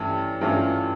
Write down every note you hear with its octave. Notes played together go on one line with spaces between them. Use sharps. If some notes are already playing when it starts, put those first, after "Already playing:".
Already playing: G2 E3 A3 C#4
G2 E3 A3 C#4 F4